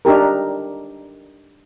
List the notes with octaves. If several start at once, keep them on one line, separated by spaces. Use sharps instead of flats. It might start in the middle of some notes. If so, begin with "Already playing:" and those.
D4 D#4 G4 A#4